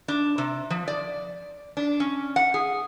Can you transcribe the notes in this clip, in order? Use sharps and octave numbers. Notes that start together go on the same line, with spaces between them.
D4
C3
F3
D5
D4
C#4
F#5
G#4